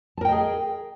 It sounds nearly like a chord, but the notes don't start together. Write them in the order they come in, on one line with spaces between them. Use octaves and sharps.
A5 A#4 G5 D#5 G#4